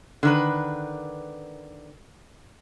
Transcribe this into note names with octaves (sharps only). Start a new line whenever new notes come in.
D3 D#3 B4